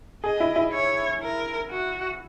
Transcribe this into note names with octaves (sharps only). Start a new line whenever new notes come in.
G#4 D#5
E4
E4
C#5
A#4
F#4